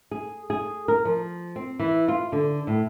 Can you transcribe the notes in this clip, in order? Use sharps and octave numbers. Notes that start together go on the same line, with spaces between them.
G#4
G#4
A#4
F3
C4
E3
F4
D3
A2